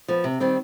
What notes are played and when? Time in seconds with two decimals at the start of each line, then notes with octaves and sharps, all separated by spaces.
0.08 F3 B3
0.24 C3
0.40 D#3 G3 C4